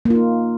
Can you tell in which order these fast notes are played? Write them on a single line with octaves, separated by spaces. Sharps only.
A#3 F4 D#4